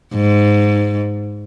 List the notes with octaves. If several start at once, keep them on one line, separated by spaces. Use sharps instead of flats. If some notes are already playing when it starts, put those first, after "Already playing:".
G#2